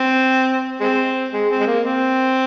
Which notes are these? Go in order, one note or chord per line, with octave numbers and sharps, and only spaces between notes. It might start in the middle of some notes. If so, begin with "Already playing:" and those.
Already playing: C4
G#3 C4
G#3
C4
G#3
A#3
C4